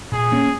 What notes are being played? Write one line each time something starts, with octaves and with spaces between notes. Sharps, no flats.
A#2 G#4
A#3 C#4